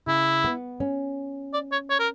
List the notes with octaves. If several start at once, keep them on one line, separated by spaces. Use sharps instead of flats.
C#3 E4
B3
C#4
D5
C#5
C#5
A#4